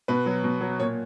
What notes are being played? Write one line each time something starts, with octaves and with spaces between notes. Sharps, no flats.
B2 B4
F#3
B2
F#3
A#2 C#5